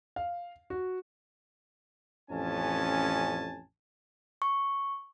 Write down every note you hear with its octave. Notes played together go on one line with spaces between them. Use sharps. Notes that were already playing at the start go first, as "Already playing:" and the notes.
F5
F#4
A1 F2 C#4 G#5 A5
C#6